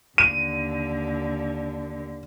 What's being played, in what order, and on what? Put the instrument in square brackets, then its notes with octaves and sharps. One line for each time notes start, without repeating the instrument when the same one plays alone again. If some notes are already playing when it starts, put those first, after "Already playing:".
[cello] D#2 D3 [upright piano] D#7